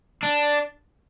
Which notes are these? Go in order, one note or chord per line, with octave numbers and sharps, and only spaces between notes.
D4